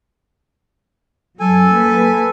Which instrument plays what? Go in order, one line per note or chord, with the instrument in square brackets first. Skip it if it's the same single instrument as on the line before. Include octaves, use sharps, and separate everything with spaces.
[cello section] F#2 F#3 [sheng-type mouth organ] A4 G#5
[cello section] A#3 B4